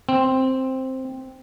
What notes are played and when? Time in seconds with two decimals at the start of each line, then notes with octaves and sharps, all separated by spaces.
0.09 C4